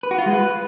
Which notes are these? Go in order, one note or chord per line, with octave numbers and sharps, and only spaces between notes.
B4
F#4
F4
G#3
B4